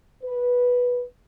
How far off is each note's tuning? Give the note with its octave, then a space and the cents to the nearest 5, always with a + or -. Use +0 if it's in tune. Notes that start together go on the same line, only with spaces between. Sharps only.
B4 -10